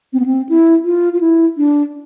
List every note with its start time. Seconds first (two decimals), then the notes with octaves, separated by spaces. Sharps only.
0.13 C4
0.20 B3
0.26 C4
0.49 E4
0.84 F4
1.13 F4
1.20 E4
1.57 D4